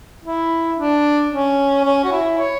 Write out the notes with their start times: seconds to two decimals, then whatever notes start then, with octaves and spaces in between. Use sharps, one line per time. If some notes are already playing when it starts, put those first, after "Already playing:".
0.24 E4
0.78 D4
1.31 C#4
1.84 C#4
2.04 F#4
2.12 E4
2.39 C#5